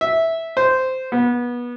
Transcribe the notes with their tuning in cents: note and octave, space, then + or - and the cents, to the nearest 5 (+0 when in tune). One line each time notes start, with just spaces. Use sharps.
E5 -10
C5 -10
B3 -25